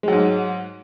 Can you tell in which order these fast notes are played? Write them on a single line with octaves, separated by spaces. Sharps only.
G#3 F#3 G#2